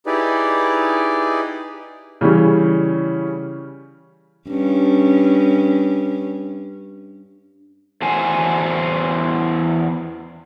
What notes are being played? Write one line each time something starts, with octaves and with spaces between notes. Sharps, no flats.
D#4 E4 G4 G#4 B4 D5
C#3 E3 G3 C#4
G2 C#4
E2 F#4 C5 G#5